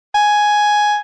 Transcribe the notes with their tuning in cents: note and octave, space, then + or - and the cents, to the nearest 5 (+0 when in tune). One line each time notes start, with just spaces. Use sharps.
G#5 +5